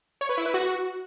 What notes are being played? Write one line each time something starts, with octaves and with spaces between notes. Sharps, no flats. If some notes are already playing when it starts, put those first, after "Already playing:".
C#5
B4
E4
B4
F#4